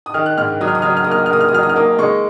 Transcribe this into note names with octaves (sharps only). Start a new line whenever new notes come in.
D#6
D#3 F6
F#6
G#2 F6
F#3 D#6
F6
D#6
F#3 F6
D#6
F6
A#3 D#6
F6
D#6
F6
A#3 D#6
F6
D#6
F#3 F6
D#6
F6
A#3 D#6
G#3 C#6